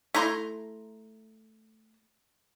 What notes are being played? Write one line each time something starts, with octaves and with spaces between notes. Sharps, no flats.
A3 E4 A#5 C6